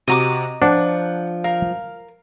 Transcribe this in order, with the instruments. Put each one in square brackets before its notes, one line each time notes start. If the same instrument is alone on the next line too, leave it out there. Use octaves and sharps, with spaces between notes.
[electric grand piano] C3 F#4 [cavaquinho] D#5 A#5 D6
[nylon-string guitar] F3 [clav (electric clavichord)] D4 [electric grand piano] F#5
[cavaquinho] A#4 [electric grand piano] F5